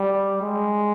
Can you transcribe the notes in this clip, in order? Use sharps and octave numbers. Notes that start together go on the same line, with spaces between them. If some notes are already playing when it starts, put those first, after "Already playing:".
Already playing: G3
G#3